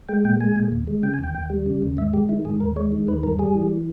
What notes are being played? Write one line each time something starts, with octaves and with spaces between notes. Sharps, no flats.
G#3 G5
A#2 G5
G#3 G#5
A#2
D#2
G#3
C#3 G5
G#5
D#2 G5
D#2
G3
C#3
D#2
G#2 E5
G#3 G4
D#3 E4
G#2 G#4
D#2 A#4
G#3 C#5
D#3
D#2 B4
G2 A#4
G3 G#4
E3